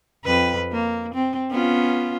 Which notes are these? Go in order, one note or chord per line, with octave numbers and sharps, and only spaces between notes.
F2 B4
A#3
C4
B3 C#4 F4